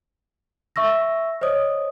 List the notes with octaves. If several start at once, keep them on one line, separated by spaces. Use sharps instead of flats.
E5 C#6 E6 A#6
C5 C#5 D#5 D#6